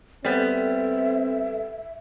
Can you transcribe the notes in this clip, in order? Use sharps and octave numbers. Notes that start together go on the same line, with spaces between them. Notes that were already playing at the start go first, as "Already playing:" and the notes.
G3 B3 C4 A4 E5